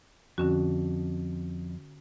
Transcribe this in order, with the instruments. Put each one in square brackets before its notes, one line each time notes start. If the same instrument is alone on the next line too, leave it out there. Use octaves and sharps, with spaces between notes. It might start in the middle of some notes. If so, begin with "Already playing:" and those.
[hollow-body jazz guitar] F2 [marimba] D3 C#4 F#4